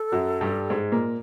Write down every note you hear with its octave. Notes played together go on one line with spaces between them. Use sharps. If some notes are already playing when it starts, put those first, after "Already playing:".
Already playing: A4
F#2 F#3
G2 G3
G#2 G#3
A#2 A#3